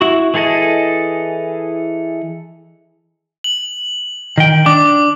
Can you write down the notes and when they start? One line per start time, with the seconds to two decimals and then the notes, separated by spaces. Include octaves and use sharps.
0.01 E4 F#4
0.34 E3 E4 G#4 A4 D#5
3.44 F#7
4.38 D#3 G5
4.66 D4 D6